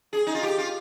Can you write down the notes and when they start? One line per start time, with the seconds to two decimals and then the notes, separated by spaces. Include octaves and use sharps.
0.13 G#4
0.27 D#4
0.34 F4
0.43 G4
0.58 F4